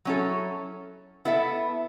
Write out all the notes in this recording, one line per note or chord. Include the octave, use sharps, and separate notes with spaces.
F#3 C#4 E4 A4
B3 E4 A4 E5